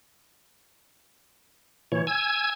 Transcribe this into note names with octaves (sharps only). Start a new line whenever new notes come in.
A#2 E3 C#5
G#5 E6 G#6